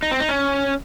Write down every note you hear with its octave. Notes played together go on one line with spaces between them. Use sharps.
D#4
C4
D#4
C#4